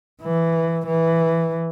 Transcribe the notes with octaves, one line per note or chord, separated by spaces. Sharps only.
E3
E3